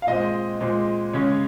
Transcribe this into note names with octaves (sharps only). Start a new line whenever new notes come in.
F5
A#2 G#3 C4 D#5
A#2 G#3 C4
C#3 G#3 C#4 C#5